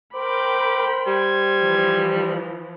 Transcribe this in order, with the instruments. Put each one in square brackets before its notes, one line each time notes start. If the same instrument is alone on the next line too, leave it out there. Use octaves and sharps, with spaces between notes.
[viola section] A#4 G5 B5 [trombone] C5 [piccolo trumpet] D6
[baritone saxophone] G3 [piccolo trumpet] G#6
[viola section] E3 F3